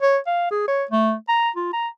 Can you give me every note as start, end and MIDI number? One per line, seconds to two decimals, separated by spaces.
0.02 0.18 73
0.27 0.47 77
0.51 0.64 68
0.68 0.84 73
0.91 1.14 57
1.29 1.50 82
1.56 1.73 65
1.73 1.88 82